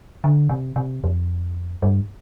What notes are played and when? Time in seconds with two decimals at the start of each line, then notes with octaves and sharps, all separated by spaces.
0.24 D3
0.49 C3
0.76 C3
1.04 F2
1.82 G2